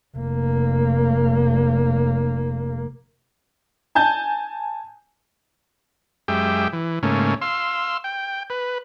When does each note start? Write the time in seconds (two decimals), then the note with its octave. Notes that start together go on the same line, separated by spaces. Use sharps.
0.16 F1 A#3
3.95 G#5 A5 G6
6.28 F#2 G#3 G4 E5 G5
6.73 E3
7.03 G#2 C#3 A3 A#3 C#4
7.41 F5 C6 E6
8.04 G5
8.50 B4